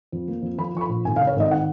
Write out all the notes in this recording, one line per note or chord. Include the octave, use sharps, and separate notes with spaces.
F2
A#3
F2
F3 B5
F3 C#6
B5
A#1
G#1 G#5
F5
C#3
C#5
G#1 D#5
D#3 F#5